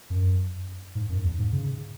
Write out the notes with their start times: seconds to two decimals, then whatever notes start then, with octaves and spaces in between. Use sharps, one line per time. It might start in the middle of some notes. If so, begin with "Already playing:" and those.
0.10 F#2
0.95 G#2
1.09 F#2
1.24 E2
1.38 G#2
1.52 C#3